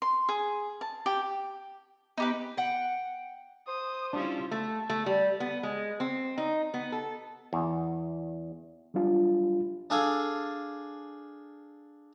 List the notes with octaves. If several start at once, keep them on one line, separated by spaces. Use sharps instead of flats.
C6
G#4
A5
G4
B3 D#4 G4 B4
F#5 G5
C5 D#6
G3 C#4 D4 E4 F4
A3
A3
G3
B3
G#3
C4
D#4
B3
A4
E2
F#3 G3 D4 F4
D4 G#4 A4 F5 G#5